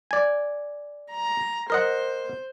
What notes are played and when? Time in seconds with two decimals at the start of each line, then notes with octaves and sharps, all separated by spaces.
0.11 D5 G#5
1.12 A#5
1.70 A#4 C5 D#5 F#5